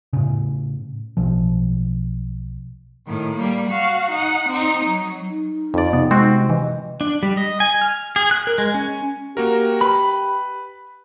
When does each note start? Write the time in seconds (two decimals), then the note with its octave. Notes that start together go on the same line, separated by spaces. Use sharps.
0.13 A2 C#3
1.17 B1 B2 F3
3.07 A2 D#3
3.36 G3 A#3
3.69 F#4 F5
4.11 D#4 F#5
4.49 C4 D#4
4.85 F#3
5.29 D#4
5.74 F2 D5
5.93 C3 B3
6.11 G#3 C4 F#4
6.50 E3 D#5
7.01 D4
7.23 G3
7.37 D#5
7.60 G#5
7.82 F6
8.16 G#4
8.31 F#6
8.47 A#4
8.58 G#3
8.74 C#4
9.37 A#3 F#4 G4 A#4
9.81 B4 B5